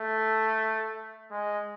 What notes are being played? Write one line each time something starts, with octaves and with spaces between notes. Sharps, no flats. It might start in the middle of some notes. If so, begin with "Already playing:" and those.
Already playing: A3
G#3